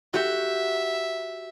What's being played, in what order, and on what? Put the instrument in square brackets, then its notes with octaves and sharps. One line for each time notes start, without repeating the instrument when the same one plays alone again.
[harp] F#4 G4 [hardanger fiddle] E5